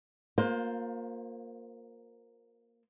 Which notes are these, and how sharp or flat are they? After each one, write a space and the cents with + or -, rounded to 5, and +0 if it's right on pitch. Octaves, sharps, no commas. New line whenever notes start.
A#3 +0 F4 +35 C5 +0